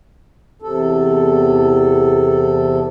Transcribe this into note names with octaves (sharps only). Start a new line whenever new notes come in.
E2 C3 A4